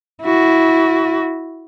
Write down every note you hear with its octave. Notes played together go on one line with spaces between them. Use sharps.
E4 F#4